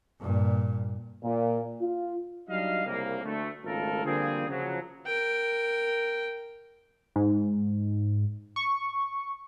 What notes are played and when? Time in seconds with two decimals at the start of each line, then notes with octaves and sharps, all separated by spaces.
0.20 G2 A#2
1.24 A#2
1.82 F4
2.48 F#3 G3 D4 D#4 D#5 F5
2.85 C2 C#3 A#3
3.24 D2 A3
3.64 G#1 C#3 A3 F4 A4 A#4
4.05 D3 F3 G3 A#3 C4 G#4
4.48 C#3 F3 F#3
5.06 A#4 G5
7.16 G#2
8.56 C#6